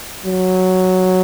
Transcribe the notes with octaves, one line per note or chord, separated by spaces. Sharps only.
F#3